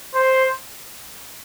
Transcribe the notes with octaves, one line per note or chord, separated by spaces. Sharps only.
C5